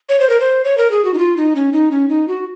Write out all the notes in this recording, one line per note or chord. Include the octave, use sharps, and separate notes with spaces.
C#5
C5
A#4
C5
C#5
A#4
G#4
F#4
D#4
F4
D#4
C#4
D#4
C#4
D#4
F#4